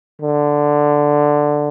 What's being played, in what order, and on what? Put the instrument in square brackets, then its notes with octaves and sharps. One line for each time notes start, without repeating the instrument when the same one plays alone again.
[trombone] D3